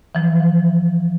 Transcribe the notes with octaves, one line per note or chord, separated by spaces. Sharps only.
E3 F3